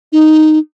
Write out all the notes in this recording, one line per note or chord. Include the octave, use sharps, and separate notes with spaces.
D#4